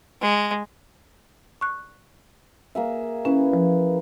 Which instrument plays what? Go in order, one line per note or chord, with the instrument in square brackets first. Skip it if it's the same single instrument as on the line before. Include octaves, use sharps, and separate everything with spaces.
[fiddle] G#3
[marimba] C#6 F#6
[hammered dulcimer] A#3 G#4 E5
[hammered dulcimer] E3 [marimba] C#4
[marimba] F3